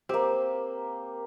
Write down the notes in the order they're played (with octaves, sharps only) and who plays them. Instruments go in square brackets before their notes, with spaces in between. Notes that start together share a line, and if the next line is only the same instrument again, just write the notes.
[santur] A#3 G4 [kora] C4